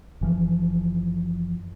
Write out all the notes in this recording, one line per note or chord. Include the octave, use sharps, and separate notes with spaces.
F#1 E3 F3